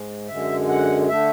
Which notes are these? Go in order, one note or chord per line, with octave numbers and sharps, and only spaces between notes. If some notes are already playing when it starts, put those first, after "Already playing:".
Already playing: G#2 G#3
F#2 D3 G#3 E5
F#5
D3 A3 E5